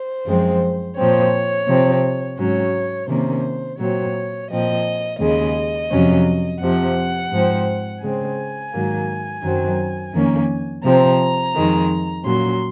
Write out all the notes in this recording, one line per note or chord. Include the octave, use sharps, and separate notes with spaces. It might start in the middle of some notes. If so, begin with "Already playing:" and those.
Already playing: C5
F#2 F3 G#3 C4
A#2 F3 C4 C#5
C3 F3 C4
G#2 F#3 C#4 C#5
C3 D#3 A#3 C#4 C5
A#2 F#3 C4 C#5
A#2 F3 C4 D#5
D#2 C#3 G#3 D#5
F2 C3 F#3 C#4
F2 C3 F3 F#5
G#2 F3 C4
C#3 G#3 C4 G#5
G#2 D#3 F#3 A#3
F#2 D#3 F#3 C4
F2 D#3 A#3 C#4
C3 F3 C4 A#5
F2 D#3 G#3
A#2 F#3 C#4 C6